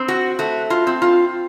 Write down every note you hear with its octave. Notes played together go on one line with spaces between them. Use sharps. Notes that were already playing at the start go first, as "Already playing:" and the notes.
Already playing: C4
F#4
A3 F#4
F4
C4
F4